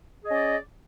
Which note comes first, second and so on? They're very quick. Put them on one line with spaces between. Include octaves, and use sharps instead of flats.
G#4 D#5 C#4 D5